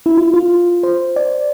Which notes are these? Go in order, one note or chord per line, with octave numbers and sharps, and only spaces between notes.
E4
F4
F4
C5
D5